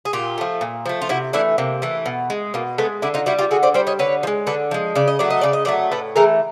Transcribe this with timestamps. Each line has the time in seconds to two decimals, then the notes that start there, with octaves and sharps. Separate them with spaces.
0.05 G#4
0.13 A#2 F4 G4
0.38 F3 A3
0.61 A#2
0.86 F3 A3
1.02 F4
1.09 C3 E4 F#4
1.33 E3 A3 D4 E4
1.58 C3 A#3
1.82 E3 A3
2.06 B2
2.30 G#3
2.54 B2 A#3
2.78 G#3 A3 B3
3.02 D3 D4 E4
3.14 D#4 F4
3.26 G3 E4 F#4
3.39 F4 G4
3.51 D3 F#4 G#4
3.63 C5 D5
3.74 G3 C5 D5
3.87 C#5 D#5
3.99 D3 B4 C#5
4.23 F3
4.27 G#3
4.47 D3 A4 B4
4.71 F3 G#3
4.96 C#3 D5
5.08 D#5
5.19 F#3 A3 D5
5.30 D#5
5.41 C#3 D5
5.53 D#5
5.65 F#3 A3 C5 D5
5.91 A2 A4 B4
6.16 E3 A3 G#4 A#4